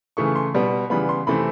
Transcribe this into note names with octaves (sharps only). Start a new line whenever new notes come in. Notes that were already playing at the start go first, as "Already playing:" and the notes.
C#3 E3 A3 C#6
C6
B2 G3 B3
C#3 E3 G3 B3 B5
C6
C3 E3 A3 C4 B5